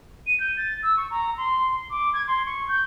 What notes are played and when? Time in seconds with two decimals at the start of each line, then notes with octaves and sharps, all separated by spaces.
0.27 D#7
0.40 G6
0.57 A6
0.83 E6
0.97 C#6
1.11 A#5
1.37 C6
1.90 D6
2.14 G#6
2.27 C6
2.46 C#6
2.69 G6